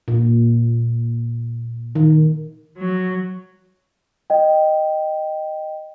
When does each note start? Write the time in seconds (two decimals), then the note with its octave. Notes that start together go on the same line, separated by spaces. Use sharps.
0.08 A#2
1.95 D#3
2.78 F#3
4.30 D#5 G5